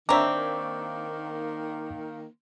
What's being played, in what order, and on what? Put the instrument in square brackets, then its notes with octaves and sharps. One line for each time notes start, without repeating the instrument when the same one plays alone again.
[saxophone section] D#3 A#3 [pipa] C4 A#5 [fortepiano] D4 C#5 E5 [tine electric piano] D6